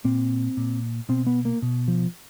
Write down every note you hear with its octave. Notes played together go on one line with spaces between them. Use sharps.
A#2 C4
A#2
B2 C4
B3
A#3
B2
F3